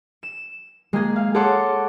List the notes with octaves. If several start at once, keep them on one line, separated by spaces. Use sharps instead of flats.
E7
G#3 A#3 G#4
F5
G#4 A4 C#5 F#5 C6 D6